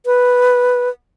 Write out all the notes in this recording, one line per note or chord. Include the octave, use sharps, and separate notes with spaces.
B4